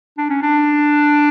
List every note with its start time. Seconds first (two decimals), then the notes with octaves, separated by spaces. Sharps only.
0.18 D4
0.30 C#4
0.42 D4